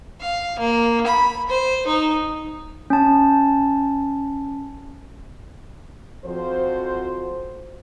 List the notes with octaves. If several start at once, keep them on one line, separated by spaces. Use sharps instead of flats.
F5
A#3
B5
C5
D#4
C#4 A5
F2 F3 F#4 C5